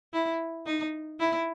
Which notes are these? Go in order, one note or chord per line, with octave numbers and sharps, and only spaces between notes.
E4
D#4
E4